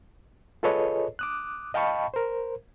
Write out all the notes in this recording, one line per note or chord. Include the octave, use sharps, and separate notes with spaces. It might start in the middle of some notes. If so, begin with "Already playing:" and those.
F4 G#4 A4 B4 C#5 D#5
D6 D#6 F#6
D#5 F5 G5 A5 B5 C#6
A#4 C5